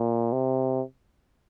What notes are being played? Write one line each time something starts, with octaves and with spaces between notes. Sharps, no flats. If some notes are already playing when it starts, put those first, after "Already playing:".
Already playing: A#2
C3